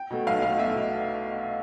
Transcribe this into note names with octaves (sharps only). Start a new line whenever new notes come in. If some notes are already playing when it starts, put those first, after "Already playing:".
Already playing: G5
B2 A3
B1 F5
B2 A3 F5
B1 E5
B2